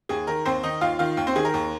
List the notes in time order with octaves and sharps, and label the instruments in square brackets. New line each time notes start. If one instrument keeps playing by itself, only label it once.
[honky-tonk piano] D#2 G#4
D#3 A#4
D#2 C4 C5
D#3 D#4 D#5
D#2 F4 F5
D#3 F4 F5
D#2
C4 C5
D#3 G#4
A#4
D#2